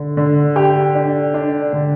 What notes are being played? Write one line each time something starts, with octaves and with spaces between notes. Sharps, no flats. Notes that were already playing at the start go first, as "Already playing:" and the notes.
Already playing: D3
D3
G4
D4
D4
D3